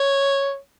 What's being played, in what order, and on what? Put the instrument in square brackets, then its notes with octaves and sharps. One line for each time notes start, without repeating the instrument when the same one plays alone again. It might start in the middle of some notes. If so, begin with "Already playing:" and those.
Already playing: [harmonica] C#5